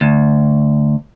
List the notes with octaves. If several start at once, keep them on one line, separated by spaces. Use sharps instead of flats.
D2